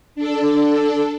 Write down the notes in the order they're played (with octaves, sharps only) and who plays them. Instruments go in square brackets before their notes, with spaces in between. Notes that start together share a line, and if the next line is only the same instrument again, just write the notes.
[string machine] D4 A4